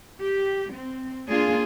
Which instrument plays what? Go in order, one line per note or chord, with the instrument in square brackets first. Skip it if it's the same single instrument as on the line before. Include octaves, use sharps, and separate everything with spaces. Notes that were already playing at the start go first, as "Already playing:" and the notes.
[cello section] G4
C4
A#3 D4 F4 G#4